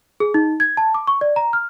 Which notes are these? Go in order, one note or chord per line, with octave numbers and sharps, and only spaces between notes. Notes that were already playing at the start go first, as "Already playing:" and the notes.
G#4
D#4
G#6
A5
D6
C#6
D5
A#5
F6